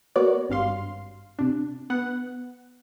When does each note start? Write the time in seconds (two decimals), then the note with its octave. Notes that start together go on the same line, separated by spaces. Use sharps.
0.16 A#3 B3 F#4 C#5 D5
0.49 G#1 G2 F5 C6
1.39 C3 D4
1.90 B3 F#5